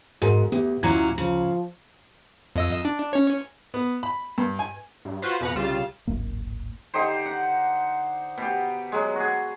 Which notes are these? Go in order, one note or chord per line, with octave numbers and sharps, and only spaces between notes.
G#2 F#4 G#4 A#4
D2 B3 G4
D2 A#2 F#3 C#4 E4 A#5 G#6
C#3 F3
F2 D#5 E6
D4
C#4 C#5
B3
B5
G2
G#5
G2
F4 F#4 B4 C5
F2 B2 B4 F#5 A#5
C2 C#3 G3 F4 A6 E7
D1 G#1 F#2 A#3
D3 D#4 G4 C5
F#5
B2 G4
F#3 G#3
F#4 G#4